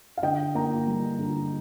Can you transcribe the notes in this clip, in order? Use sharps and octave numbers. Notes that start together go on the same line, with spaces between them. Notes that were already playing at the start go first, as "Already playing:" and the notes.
F5
D3 D#5 G5
A#3 G5 A#5
G3
D3